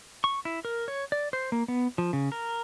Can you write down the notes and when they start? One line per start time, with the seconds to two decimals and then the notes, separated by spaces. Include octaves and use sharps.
0.24 C#6
0.45 E4
0.65 A#4
0.88 C#5
1.12 D5
1.33 C5
1.52 A#3
1.68 B3
1.98 F3
2.13 C#3
2.32 A#4